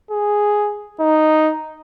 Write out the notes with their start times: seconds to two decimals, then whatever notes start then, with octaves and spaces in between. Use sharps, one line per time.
0.11 G#4
1.00 D#4